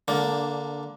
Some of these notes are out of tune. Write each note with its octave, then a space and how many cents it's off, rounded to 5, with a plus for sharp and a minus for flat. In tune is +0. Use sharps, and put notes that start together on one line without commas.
D3 -15 A#3 +0 D4 +0